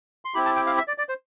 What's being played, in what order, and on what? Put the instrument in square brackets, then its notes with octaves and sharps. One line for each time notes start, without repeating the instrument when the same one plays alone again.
[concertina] C6
C4 E4 G4 B5
A5
G5
F5
E5
D5
D5
C5